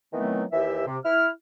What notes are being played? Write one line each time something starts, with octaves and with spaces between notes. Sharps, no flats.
D#3 E3 F#3 A3 B3 C4
D#2 E3 G4 E5
C3
E4 F6